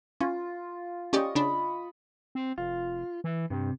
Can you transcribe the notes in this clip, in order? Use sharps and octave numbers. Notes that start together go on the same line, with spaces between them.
C#4 F4
C#4 G4 D5 D#5 C#6
C#3 D4 B5
C4
F1 F4
E3
G2 C3